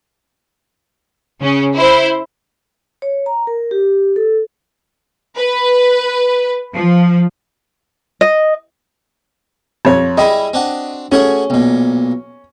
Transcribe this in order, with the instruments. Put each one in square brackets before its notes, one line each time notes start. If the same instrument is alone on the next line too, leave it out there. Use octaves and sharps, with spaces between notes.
[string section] C#3 C#4
E4 C5
[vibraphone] C#5
A#5
A#4
G4
A4
[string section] B4
F3
[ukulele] D#5
[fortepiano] F2 C#5
[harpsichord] G3 E4 G#4 [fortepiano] D#5
[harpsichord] C4 D4 F#4
[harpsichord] A3 F#4 G#4 [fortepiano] C#4
[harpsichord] B1 A#2